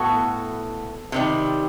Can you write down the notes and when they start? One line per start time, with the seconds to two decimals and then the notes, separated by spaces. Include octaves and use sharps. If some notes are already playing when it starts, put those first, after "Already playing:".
Already playing: A2 B3 F#4 A4
1.12 C3 D#3 G3